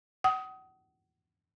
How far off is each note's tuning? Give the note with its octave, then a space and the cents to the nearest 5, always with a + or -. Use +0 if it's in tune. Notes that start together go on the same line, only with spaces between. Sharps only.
F#5 +35 D#6 +20